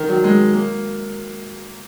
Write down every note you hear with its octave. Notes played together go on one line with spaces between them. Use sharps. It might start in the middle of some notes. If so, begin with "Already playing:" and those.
Already playing: D#3
F#3
G#3
A#3